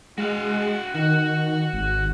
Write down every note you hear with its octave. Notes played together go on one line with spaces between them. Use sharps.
G#3 F#4 F5
D#3 F#4
G#1